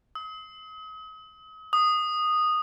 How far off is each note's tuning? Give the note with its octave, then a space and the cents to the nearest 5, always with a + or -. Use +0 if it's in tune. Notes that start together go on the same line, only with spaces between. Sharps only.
D#6 +40
D#6 -10